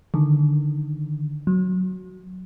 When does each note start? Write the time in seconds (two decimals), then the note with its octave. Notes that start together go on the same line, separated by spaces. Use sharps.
0.14 D3 D#3
1.47 F#3